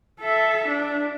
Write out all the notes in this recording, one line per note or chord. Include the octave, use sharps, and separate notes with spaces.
A4 E5
D4